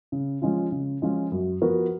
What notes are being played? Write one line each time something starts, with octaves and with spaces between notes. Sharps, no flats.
C#3
F3 G#3 C#4 F4
C#3
F3 G#3 C#4 F4
F#2
F3 B3 F#4 A#4